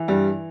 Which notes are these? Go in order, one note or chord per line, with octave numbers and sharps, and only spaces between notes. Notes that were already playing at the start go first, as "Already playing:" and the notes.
Already playing: E3
G2 G3